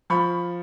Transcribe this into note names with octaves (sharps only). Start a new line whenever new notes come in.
F3 B5 C#6